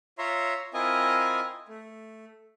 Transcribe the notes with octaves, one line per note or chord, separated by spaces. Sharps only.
F4 C#5 E5 A#5 C6
C4 E4 F4 A#4 D#5 G#5
A3